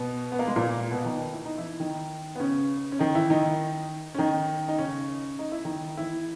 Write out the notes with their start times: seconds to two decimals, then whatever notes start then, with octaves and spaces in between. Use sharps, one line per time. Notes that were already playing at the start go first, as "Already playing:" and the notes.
Already playing: B2 B3
0.32 B3
0.39 A#3
0.47 G#3
0.56 A#2 A#3
0.91 B2 B3
1.05 D#3 D#4
1.33 E4
1.45 D#4
1.58 E3 E4
1.80 D#3 D#4
2.35 B3
2.40 C#3 C#4
2.92 C#4
2.99 D#3 D#4
3.15 E3 E4
3.30 D#3 D#4
4.15 C#4
4.18 D#3 D#4
4.68 D#4
4.78 C#3 C#4
5.39 D#4
5.52 E4
5.65 D#3 D#4
5.97 E3 E4